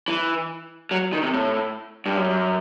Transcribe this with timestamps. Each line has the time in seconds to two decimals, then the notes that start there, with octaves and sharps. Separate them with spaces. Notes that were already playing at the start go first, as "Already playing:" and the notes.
0.08 E3
0.91 F#3
1.13 D#3
1.23 C3
1.34 A2
2.06 G2
2.17 F#2